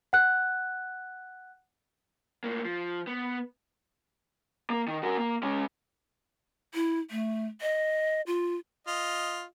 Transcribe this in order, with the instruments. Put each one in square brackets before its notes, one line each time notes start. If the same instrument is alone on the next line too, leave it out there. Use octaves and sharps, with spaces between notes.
[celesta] F#5 F#6
[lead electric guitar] A2 A#3
F3
B3
A#3
D#3
F#4 A#4
A#3
G#3 C#4
[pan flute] E4
A3
D#5
F4
[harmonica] F4 D#5